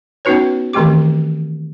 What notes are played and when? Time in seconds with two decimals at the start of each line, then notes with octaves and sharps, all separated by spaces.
0.25 B3 C#4 D#4 F#4 B4 C#5
0.73 D#3 E3 A3 C4 G4 D6